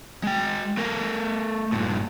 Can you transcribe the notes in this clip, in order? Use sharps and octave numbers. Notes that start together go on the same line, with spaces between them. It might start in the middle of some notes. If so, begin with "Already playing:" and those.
G#3 G5
A3 A#4
G2 A#2